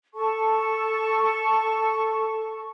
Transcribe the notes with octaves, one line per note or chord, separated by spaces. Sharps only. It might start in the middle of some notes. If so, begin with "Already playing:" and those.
A4 A5 C#6